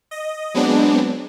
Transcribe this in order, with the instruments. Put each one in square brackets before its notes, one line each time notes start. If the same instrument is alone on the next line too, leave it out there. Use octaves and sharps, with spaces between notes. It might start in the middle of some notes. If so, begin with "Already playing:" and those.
[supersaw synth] D#5
F#3 G#3 B3 C4 D4